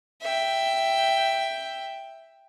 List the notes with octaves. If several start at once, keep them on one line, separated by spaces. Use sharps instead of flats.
E5 G5